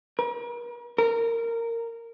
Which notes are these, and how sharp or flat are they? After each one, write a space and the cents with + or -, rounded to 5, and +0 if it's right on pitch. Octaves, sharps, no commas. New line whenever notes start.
A#4 +45
A#4 -15